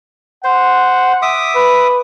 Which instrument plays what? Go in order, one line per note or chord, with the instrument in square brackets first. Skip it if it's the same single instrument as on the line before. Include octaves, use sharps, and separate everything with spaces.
[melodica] C5 [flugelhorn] F#5
[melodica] E5 D6 D#6
[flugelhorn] B4